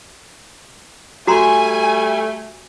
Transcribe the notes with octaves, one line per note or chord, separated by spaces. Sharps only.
G3 A3 F#4 G#5 A#5 C6